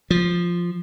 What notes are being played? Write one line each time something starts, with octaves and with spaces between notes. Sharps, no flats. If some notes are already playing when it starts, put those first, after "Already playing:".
F3